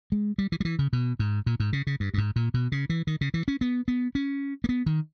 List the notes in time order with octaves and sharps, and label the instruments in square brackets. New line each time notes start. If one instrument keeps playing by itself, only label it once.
[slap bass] G#3
G3
E3
G3
E3
C#3
B2
G#2
A#2
G#2
C#3
C#3
G2
G2
G#2
A#2
B2
C#3
E3
D#3
C#3
E3
C#4
B3
B3
C#4
A#3
B3
D#3